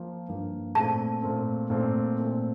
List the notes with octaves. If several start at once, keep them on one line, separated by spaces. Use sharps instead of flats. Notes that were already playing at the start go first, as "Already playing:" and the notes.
Already playing: F3 A#3
G2 F3 A#3
A#2 A3 C4 A5
A#2 A3 C4
A#2 A3 C4
A#2 A3 C4